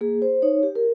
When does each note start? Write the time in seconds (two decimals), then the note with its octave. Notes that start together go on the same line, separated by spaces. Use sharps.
0.01 A#3 G#4
0.22 C5
0.42 D#4 C#5
0.63 G4
0.76 A#4